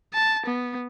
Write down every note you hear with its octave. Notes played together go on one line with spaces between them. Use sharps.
A5
B3